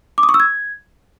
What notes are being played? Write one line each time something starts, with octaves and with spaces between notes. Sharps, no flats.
D6
D#6
C#6
E6
G#6